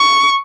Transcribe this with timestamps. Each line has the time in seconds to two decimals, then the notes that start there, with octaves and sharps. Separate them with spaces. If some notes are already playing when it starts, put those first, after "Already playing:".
Already playing: C#6